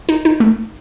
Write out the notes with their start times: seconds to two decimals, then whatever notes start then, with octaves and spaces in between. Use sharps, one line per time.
0.09 D#4
0.25 D#4
0.40 A3